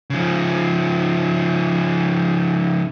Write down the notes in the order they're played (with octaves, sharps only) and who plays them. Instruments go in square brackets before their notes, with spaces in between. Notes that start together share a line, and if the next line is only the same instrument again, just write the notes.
[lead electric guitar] C#3 F3